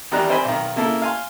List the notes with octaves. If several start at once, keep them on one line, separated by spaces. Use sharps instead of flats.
E2 D#3 G3 D4 A#5 F#6
C4 D#4 C5 G5 G#5 B5
B1 D#3
C#3 A#3 E4 A4
F5 G#5 C6